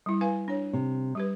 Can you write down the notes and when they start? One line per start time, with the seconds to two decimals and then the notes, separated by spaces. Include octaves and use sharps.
0.06 G3 E4
0.21 B4 F5 G#5
0.48 D4 C#5
0.73 C3
1.15 G3 G4 B4